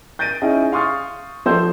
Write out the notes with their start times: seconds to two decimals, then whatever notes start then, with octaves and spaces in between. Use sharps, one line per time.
0.19 G6 A6 A#6 D7 D#7
0.42 C#4 D#4 E4 G#4
0.72 F5 C6 C#6 D#6 F6 A6
1.46 F3 A4 C5 E6 G6